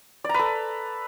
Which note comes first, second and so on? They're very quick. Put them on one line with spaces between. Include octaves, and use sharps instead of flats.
D5 A#5 B4 A4